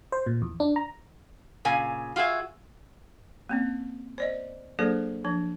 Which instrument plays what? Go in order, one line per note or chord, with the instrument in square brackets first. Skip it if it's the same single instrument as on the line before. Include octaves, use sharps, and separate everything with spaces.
[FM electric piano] C5
A#2
E2
D4
A#5
[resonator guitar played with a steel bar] A#2 C#3 G#5
F4 F#4 G#4 E5
[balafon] A#3 C4 C#4
C5 D5 D#5
F#3 A#3 D4 G#4 A4 C5
F3 D4